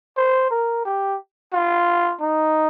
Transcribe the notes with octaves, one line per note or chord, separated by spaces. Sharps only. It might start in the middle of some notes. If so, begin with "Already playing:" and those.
C5
A#4
G4
F4
D#4